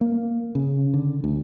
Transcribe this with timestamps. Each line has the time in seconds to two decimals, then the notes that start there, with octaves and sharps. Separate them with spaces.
0.01 A#3
0.55 C#3
0.94 D3
1.24 D2